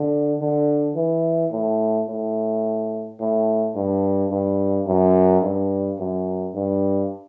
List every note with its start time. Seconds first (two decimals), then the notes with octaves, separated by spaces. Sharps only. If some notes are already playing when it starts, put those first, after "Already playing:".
Already playing: D3
0.39 D3
0.96 E3
1.52 A2
2.07 A2
3.20 A2
3.75 G2
4.30 G2
4.87 F#2
5.42 G2
5.98 F#2
6.54 G2